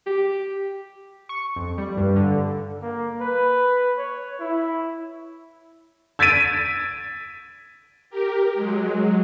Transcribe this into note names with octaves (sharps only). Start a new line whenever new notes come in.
G4
C#6
F2
G3
G2
D3
A#3
B4
C#5
E4
E6 G#6 A6 B6 D7 D#7
G4 A#4
F#3 G#3